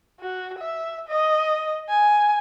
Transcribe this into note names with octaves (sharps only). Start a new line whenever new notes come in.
F#4
E5
D#5
G#5